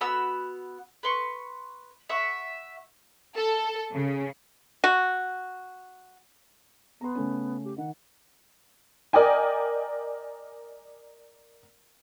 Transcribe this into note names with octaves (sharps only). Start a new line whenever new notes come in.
B3 F#4 B5 E6
B4 C6 C#6
E5 F#5 C#6
A4
C#3
F#4
B3 A#5 C6
C#3 A3 C#4
G4
D#3 F#5
A#4 D5 D#5 G5 G#5